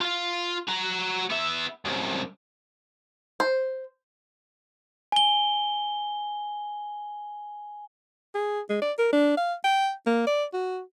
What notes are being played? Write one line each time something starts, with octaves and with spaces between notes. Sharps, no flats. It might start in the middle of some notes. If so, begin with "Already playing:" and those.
F4 F5
F#4 A#5
B3 E5
C2 F#2
C5
G#5 G7
G#4
G#3
D5
A#4
D4
F5
G5
A#3
D5
F#4